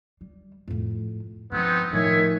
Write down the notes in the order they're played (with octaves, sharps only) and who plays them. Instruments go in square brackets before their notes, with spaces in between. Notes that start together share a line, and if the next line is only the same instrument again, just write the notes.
[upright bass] G3
F2 A2
[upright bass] G2 F3 [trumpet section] B3 C4 D#4
[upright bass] A2 F3 [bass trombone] D#3 [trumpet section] C#5 E5 G#5